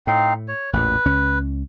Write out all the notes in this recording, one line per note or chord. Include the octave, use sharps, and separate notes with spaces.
A2 C4 D#4 F5
C#5
A1 E2 A#2 B4
C#2 C#4